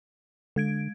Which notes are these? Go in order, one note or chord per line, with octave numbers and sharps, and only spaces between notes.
D3 G#3 G#6 D7